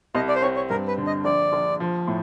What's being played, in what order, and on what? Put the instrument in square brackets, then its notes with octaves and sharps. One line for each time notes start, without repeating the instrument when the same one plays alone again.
[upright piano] C2 [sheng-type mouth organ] D#5
[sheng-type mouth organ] D5
C5
[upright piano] C4 [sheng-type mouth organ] C#5
[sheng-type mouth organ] C#5
[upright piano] G2 [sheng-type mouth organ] A#4
[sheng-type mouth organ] B4
[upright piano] D3
[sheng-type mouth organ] D#5
[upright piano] A#1 [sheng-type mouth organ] D5
[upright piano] A#1
F3
A2